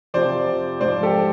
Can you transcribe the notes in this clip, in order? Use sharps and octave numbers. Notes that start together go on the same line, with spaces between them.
F2 C3 F3 C5 D5
G#2 F3 C5 D5
G4 A4